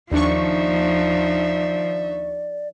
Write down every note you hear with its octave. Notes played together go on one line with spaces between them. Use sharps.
D#2 F3 D4 D#4 D5 E5 C#6